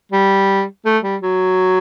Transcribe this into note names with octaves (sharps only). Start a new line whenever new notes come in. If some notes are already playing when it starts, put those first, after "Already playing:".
G3
A3
G3
F#3